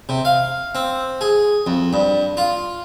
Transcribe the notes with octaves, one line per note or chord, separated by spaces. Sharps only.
C3
F5
C4
G#4
F2
G2
F4